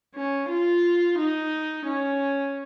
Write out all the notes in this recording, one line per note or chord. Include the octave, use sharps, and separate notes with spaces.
C#4
F4
D#4
C#4